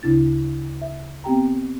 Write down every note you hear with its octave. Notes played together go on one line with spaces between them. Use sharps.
D2 C#3 D4 E4 A6
E5
B3 C4 G4 G5 A#5